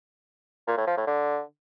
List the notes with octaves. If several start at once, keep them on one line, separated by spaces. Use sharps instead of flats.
A#2
A2
F3
A2
D3